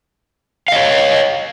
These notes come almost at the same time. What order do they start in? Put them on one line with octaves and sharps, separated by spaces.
F5 D#5 C#5